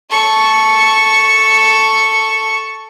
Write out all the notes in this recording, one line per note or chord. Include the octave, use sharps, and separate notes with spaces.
A4 C#6